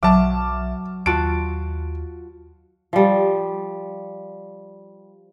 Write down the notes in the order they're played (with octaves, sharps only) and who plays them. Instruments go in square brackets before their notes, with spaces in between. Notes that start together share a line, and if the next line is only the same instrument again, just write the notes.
[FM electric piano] B1 E5 F6 [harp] F#3 [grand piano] A5 D6
[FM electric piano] D#2 [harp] F4 F#4 A5 [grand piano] D7
[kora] F3 G3